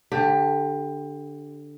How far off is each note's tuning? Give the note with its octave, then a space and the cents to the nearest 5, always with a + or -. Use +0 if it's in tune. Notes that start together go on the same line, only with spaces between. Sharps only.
D3 +0 G4 +20